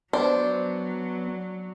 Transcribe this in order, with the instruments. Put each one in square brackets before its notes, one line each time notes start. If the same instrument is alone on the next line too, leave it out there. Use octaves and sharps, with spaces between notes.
[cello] F#3 [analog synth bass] B3 [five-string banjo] D4 C5 [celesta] D5